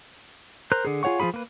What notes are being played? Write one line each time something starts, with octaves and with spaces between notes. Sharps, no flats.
A#4 C5 F#6
D3 G#4
F4 G#4 C#5 F#5 C#6
F3 C4 F4 G#4 B5
A#3 B4